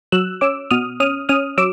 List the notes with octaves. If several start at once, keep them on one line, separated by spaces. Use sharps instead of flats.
F#3 E6 F#6
C#4 D6 E6
B2 D#6 F6
C#4 D#6 F6
C#4 D#6 F6
F#3 D6 E6